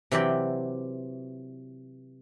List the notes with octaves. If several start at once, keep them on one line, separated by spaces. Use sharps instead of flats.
C3 E3 F#3 G4 D5 G5